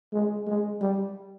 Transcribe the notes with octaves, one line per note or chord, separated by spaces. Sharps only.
G#3
G#3
G3